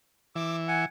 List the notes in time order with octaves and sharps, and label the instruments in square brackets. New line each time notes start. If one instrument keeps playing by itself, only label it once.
[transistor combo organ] E3 [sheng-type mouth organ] D6 E6
[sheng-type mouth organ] F#5 G#5